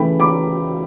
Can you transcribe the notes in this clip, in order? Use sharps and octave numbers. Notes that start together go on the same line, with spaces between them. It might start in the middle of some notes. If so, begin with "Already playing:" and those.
Already playing: C#3 E3 A3 G5 B5
B5 D6